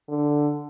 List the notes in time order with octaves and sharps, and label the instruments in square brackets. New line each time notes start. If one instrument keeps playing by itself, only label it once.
[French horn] D3